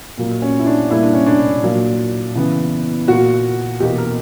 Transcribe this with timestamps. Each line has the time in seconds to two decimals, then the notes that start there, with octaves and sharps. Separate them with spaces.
0.17 A#2 F#3 A#3
0.42 C#4
0.59 E4
0.66 D4
0.90 A#2 G3 A#3 E4
1.03 D4
1.13 C#4
1.26 D4
1.63 A#2 F#3 A#3
2.35 C#3 E3 B3
3.08 A#2 A#3 F#4
3.80 E2 B2 A#3 G4
3.98 A#4